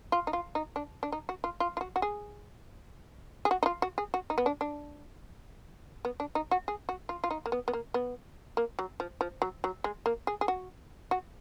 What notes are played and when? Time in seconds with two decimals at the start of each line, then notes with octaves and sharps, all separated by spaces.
0.12 F4
0.27 D#4
0.33 F4
0.55 D#4
0.76 D4
1.03 D4
1.12 D#4
1.29 F#4
1.44 F4
1.60 F4
1.77 F4
1.81 F#4
1.96 F#4
2.02 G#4
3.45 G#4
3.51 F#4
3.63 D#4
3.66 F4
3.82 F#4
3.98 G#4
4.14 F#4
4.30 D#4
4.38 B3
4.46 D4
4.61 D4
6.05 B3
6.20 D4
6.35 D#4
6.51 F#4
6.68 G#4
6.89 F#4
7.09 F4
7.24 F4
7.31 D#4
7.46 A#3
7.52 B3
7.68 B3
7.73 A#3
7.94 B3
8.57 A#3
8.79 F#3
9.00 F3
9.21 F3
9.42 F#3
9.64 F#3
9.84 G#3
10.06 A#3
10.27 G#4
10.41 G#4
10.48 F#4
11.11 F#4